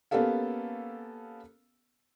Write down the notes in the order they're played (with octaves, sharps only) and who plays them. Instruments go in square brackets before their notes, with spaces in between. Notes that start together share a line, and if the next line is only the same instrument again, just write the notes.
[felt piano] A#3 B3 C#4 G4 A4 F5